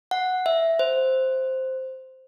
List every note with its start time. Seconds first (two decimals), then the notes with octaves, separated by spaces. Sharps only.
0.11 F#5
0.46 E5
0.79 C5